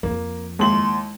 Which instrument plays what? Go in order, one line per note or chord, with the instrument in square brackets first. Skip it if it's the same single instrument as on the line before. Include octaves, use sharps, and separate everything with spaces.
[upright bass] F2 F3 [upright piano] A#3
[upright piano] D#2 F#7 [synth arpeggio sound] G#3 E4 [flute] C6